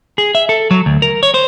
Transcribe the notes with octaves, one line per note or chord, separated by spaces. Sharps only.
G#4
E5
A4
F#3
D2
A#4
C#5
C5